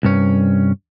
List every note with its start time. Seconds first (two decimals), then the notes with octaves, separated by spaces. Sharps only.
0.03 C2 G2 C#4